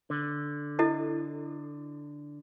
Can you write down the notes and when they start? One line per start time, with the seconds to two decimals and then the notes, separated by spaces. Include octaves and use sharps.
0.10 D3
0.79 E4 A4 D#5